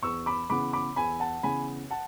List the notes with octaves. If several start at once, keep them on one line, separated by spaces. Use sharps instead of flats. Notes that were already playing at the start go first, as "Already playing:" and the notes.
E2 C#6 E6
B5 D6
C#3 E3 B3 B5 D6
B5 D6
E2 G#5 B5
F#5 A5
C#3 E3 B3 G#5 B5
F#5 A5